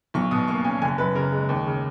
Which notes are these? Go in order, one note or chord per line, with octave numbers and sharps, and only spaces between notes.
B1 C#6
B2 D#6
A#3 C#6
C#4 G#5
F#1 G#5
F#2 B4
C#3 A#4
G#3
D#2
C#3